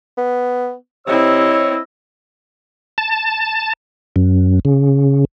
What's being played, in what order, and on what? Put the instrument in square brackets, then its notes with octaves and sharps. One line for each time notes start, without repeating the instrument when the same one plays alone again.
[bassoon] B3
[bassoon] C3 [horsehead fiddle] C4 E4 [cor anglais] C#5 [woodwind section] D#5 E6
[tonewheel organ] A5
F#2
C#3